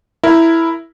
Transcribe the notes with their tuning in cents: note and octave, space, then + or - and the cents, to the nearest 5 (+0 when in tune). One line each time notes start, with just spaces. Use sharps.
E4 +0 A#4 +0 A#5 +0